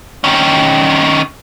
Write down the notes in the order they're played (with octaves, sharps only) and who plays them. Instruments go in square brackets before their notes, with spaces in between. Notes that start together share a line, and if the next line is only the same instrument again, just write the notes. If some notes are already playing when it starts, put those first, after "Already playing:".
[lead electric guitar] D#3 C#4